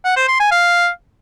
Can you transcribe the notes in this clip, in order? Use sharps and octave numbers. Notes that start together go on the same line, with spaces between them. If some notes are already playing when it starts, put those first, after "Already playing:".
F#5
C5
C6
G#5
F5